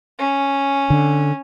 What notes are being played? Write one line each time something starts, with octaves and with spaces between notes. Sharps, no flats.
C#4
D3